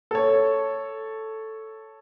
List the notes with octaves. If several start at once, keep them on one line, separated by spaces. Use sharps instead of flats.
A4 C#5